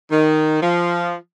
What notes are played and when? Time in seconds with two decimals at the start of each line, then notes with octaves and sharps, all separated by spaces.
0.11 D#3
0.62 F3